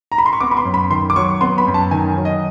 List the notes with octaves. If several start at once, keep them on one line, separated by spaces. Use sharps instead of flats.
A#5
B5
C6
C#6
B3 D6
B5
C6
F#2
B5
D#3 C6
D6
F#3 C#6
B3 C6
B5
F#2
A5
D#3 G#5
F#3
D#5